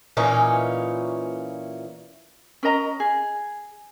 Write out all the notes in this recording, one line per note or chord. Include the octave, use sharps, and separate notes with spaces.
A#2 E3 C#4 D#4
C#4 A#4 D#5 A#5
G#4